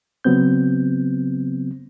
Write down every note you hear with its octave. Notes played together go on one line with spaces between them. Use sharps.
C#3 F#3 B3 C4 G6